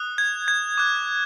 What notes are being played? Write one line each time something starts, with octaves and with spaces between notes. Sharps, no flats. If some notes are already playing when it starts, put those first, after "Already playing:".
Already playing: D#6 F#6
G#6
G#6
D6 F#6